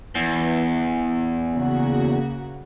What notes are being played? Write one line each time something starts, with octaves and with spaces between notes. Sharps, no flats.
E2 E3
C#3 A#3 F#4